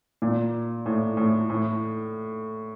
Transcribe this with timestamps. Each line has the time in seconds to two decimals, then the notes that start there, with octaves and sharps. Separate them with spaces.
0.22 A#2
0.86 A2
1.17 A2
1.50 A2